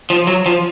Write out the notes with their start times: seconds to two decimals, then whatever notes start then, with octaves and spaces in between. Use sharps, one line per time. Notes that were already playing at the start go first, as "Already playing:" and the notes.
0.10 F3
0.27 F#3
0.46 F3